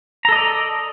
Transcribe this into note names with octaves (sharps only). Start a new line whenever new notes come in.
A4 D5 D#5 A#5